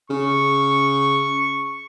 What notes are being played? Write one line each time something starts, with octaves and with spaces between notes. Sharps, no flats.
C#3 C#6